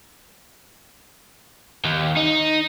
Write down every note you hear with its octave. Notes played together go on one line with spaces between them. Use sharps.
D#2
D#4